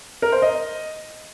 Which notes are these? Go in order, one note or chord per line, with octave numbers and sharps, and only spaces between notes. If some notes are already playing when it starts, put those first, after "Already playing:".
A#4
C5
D#5